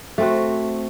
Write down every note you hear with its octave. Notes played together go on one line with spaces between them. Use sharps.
A3 C4 F#4